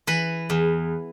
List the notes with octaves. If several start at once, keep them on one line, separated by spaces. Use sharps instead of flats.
E3 B4
E2